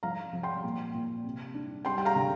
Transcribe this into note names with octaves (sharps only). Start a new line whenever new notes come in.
F3 F5 A#5
F3
G5 C6
A#2
A#2
C3
D4
G3 G5 C6
G5
F5 A#5
D3